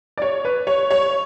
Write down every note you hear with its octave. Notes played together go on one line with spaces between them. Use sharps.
D5
C#5
B4
C#5
C#5